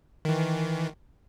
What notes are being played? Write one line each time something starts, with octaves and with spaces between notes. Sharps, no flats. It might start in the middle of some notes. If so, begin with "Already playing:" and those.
D#3 E3